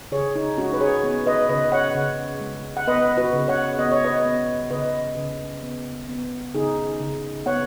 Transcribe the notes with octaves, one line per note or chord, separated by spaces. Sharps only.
C#3 G#4 C#5
D#4
G#3 C#4 F#4
B4
G#4 C#5
B3
B4 D#5
C#3 B4 D#5
C#5 F#5
C#3
G#3
F#5
B3 B4 D#5
F#4 B4
C#3
C#5 F#5
B3 D#5
C#5
B4 D#5
B3
C#3 B4 D#5
C#3
B3
B3
C#3 D#4 G#4
C#3
B3 C#5 F#5